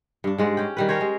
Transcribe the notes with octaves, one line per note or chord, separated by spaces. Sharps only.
G2 D4
G#2 G#3 D5 F#5
C#4 G5
D#3 G3 B4
C#4 A#4 C5 C#5
G#3